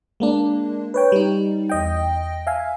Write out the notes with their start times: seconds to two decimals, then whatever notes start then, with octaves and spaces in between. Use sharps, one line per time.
0.20 G#3 A#3 D4
0.94 B4 C#5 G5
1.12 G3 D#4
1.69 E2 D#5 G5
2.47 E5 F5 G#5